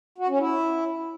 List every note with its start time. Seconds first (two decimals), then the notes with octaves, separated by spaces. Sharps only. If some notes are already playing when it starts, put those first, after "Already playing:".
0.18 F#4
0.29 C#4
0.39 E4